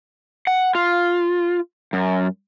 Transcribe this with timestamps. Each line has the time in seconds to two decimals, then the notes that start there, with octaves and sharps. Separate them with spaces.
0.47 F#5
0.75 F4
1.93 F#2